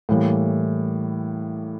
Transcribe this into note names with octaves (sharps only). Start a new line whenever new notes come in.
A2 E3 G3 A#3